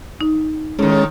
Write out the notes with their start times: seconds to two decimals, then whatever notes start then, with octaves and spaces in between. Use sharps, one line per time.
0.21 D#4
0.79 A2 D#3 G#3 C#4